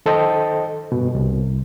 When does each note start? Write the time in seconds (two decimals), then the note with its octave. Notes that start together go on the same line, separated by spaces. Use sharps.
0.06 D#3 A4 C5 D#5 G5
0.92 G2 B2
1.15 C2